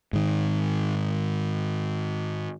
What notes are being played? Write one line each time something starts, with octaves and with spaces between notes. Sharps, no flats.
G#2 D#3